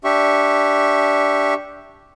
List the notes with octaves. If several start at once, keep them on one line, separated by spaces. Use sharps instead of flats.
D4 G4 E5 C#6